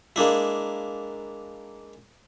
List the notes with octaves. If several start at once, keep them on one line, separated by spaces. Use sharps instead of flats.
G#3 A#3 D4 E4